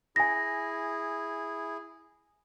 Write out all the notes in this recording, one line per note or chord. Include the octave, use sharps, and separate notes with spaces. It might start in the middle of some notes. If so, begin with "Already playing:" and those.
E4 G#4 G#5 A#6